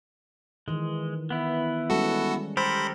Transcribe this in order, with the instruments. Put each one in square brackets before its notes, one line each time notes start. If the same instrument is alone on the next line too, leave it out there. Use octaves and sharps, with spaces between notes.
[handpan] D#3 E3 [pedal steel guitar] G#3
[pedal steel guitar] B3 E4
[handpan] G3 G#3 C#4 [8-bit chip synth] F#4 A4
[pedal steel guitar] G4 A4 A#4 [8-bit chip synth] C5 B5